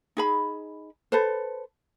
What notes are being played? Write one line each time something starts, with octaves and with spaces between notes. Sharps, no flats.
D#4 G#4 B5
A4 B4 C5